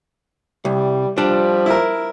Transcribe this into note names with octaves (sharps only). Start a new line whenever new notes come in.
C2 G3
F3 G3 D4
E4 A#4